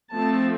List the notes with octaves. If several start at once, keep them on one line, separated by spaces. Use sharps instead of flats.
F3 A3 C4 A5